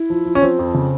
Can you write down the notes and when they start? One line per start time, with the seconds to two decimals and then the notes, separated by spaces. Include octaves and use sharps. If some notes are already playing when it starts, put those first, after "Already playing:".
Already playing: E4
0.10 F3
0.25 F3
0.35 C#4
0.42 F3 C4
0.59 F2
0.74 C#3